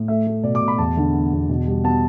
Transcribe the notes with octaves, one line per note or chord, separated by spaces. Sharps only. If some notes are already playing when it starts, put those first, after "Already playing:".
Already playing: A2
A3 E5
A3
B2 D5
D6
B2
B5
E2 A5
D3
B3
E2
B2
G3
B3 A5